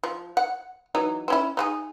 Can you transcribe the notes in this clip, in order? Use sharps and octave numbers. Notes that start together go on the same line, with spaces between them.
F3
F#5
E3 F#3 D#4
C4 C#4 E4
D#4 F#4 G#4